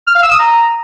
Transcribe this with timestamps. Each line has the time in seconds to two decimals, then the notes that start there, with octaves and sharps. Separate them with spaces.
0.07 F6
0.15 F5
0.23 E6
0.31 D#6
0.39 A#5